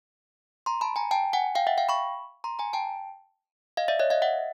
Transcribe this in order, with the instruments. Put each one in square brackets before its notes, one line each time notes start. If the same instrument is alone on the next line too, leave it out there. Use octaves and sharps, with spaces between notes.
[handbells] A#5 C6
A5 B5
G#5 A#5
G5 A5
F#5 G#5
F5 G5
E5 F#5
F5 G5
B5 C#6
A#5 C6
G#5 A#5
G5 A5
D#5 F5
D5 E5
C#5 D#5
D#5 F5
E5 F#5